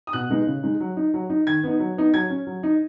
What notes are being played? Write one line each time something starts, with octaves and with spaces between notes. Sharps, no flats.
D#6
B2 F#6
G#3 B3 D#4
C#3
G#3 D#4
F#3
D#4
F#3
D#4
D#3 G#6
B3 D#4
F#3
B3 D#4
F#3 G#6
C#4
F#3
D#4